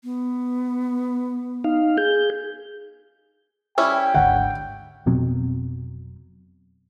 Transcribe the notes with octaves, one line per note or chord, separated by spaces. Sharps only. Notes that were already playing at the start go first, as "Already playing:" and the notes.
B3
D#4 F5
G#4 G6
G3 C#4 E4 G5
G#1 D2 D3 F#5
F1 B2 F#3 C4